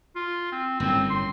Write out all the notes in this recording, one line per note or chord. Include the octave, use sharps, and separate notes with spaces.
F4
C4
G1 F#2 A2 C4
C6